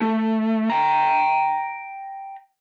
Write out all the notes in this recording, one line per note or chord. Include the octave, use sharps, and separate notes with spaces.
A3
G5 A#5